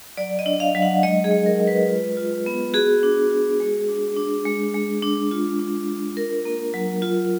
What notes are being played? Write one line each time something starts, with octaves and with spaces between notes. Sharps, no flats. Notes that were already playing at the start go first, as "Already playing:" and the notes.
F#3 D5
D#5
D4
F5
F#3
F#5
G#3 D#5
G#4
G#3
A#4
G#3
B4
F4 B4
F4
B3
F#4 G#4
D4
F#4
G#3
D4
D4
G#3
G#3
D4
F4
D4
F4
D4 A#4
A#3
F#3
F4